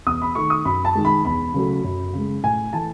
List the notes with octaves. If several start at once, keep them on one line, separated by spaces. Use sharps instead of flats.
E2 D#6
B5
D#3 A3 C#6
D#6
F#2 B5
A5
D#3 G#3
B5
E2 B5
C#3 F#3 A3
F#2
C#3 G#3
A2 G#5
E3 A3 A5